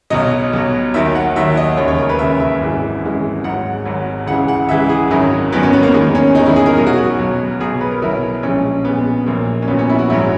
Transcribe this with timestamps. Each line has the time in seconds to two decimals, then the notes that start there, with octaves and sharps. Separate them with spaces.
0.10 B1 B2 F#3 D#5
0.53 B1 B2 F#3
0.94 D#2 D#3 F#3 E5
1.15 F#5
1.36 D#2 D#3 F#3 E5
1.57 D#5
1.77 E1 D#2 C#3 C#5
1.88 C#5
1.99 A#4
2.09 B4
2.19 E1 D#2 C#3 E5
2.40 E5
2.61 G#1 F#2 E3 G#3
3.02 G#1 F#2 E3 G#3
3.44 G#1 G#2 F#3 F#5
3.85 G#1 G#2 F#3
4.27 C#2 C#3 E3 G#3 F#5
4.48 F#5
4.69 C#2 C#3 E3 G#3 E5
4.89 G#4
5.10 G#1 F#2 D#3 F#3 E4
5.52 G#1 F#2 D#3 F#3 B3
5.63 C#4
5.73 B3
5.83 A#3
5.94 E2 D#3 G#3 B3
6.15 C#4
6.35 E2 D#3 G#3 D#4
6.46 E4
6.56 G#4
6.66 A#4
6.77 B1 B2 F#3 G#4
6.87 F#4
6.98 F#4
7.19 B1 B2 F#3
7.60 B1 B2 F#3 G#4
7.81 B4
7.91 A#4
8.02 B1 B2 F#3 E4
8.43 A#1 A#2 G#3 C#4
8.85 A#1 A#2 G#3 B3
9.26 A#1 A#2 F#3 A#3
9.62 C#4
9.68 A#1 A#2 F#3 B3
9.79 C#4
9.89 E4
9.99 F#4
10.10 A#1 G#2 F#3 E4